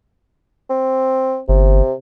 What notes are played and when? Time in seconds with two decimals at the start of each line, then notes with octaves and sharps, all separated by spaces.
0.70 C4
1.49 G1 C3